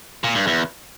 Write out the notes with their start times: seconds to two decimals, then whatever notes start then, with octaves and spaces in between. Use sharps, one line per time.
0.24 A#2
0.35 G2
0.47 E2